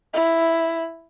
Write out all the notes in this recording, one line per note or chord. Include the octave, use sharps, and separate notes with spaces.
E4